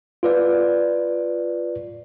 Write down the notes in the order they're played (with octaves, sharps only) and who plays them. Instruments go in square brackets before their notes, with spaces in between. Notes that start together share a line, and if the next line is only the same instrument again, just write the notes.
[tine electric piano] F4 B4 D5